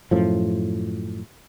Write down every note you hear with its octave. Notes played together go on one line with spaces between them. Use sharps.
F#2 A2 F3